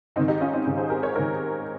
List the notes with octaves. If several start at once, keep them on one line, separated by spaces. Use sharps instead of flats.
G#2 D#3 C4 D#4
D#4 G4
C#4 F4
C4 D#4
G#2 D#3 C#4
G#4 C5
G4 A#4
A#4 C#5
G#2 D#3 A#4 C#5